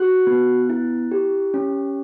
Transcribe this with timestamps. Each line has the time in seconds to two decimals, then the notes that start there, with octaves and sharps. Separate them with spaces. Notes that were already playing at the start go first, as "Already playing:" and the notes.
Already playing: F#4 F#6
0.27 B3
0.70 E4
1.11 G4
1.54 C#4